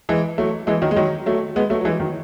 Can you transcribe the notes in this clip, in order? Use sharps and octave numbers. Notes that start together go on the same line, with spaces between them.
E3 G#3
F#3 A3
E3 G#3
D#3 F#3
G#3
D#3 F#3
F#3 A3
G#3 B3
F#3 A3
F#3
E3 G#3
D#3 F#3